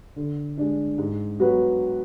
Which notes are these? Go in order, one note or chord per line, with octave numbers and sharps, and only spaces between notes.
D3
G#3 D4
G#2
F#3 B3 F#4 B4